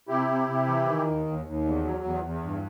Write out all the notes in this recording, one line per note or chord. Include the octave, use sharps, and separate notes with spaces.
C3 E4 G4
C3
C3
E3
D#3
D#2
D#2
D#2
E2
F#3
E2
E2
G2